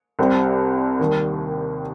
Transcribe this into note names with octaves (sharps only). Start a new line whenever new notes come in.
C2 C3 G3 C4
D#2 D#3 G3